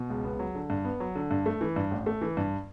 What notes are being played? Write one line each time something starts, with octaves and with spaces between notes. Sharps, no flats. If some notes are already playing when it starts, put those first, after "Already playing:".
Already playing: B2
C#2
B3
F#3
D3
G2
B3
F#3
D3
G2
A3
E3
G2
A1
A3
E3
G2